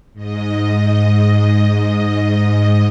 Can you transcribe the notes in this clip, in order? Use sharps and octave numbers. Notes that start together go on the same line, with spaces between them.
G#2 D#5